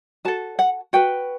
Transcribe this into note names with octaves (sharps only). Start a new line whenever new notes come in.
F#4 A4 A5
F#5
F#4 B4 G5